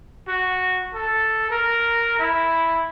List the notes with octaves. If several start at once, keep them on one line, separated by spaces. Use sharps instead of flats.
F#4
A4
A#4
E4